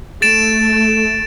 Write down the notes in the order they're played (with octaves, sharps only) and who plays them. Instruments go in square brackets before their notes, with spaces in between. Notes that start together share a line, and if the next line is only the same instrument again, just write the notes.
[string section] A3 [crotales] A6 D7 E7